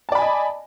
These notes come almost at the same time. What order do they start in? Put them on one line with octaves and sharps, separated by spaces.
A5 D5 B5 G#5 D#5